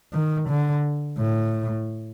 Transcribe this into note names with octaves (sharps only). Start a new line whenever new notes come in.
D#3
D3
A2